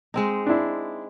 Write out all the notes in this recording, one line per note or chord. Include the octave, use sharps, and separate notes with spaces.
G#3 C4 D#4
D4 E4